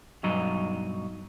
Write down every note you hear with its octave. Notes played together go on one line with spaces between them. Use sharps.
B1 G2 F#3 D#4